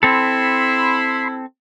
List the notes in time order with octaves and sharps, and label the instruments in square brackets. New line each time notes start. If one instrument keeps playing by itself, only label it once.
[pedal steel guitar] C4 A4 [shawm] E4 [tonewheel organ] B5 C6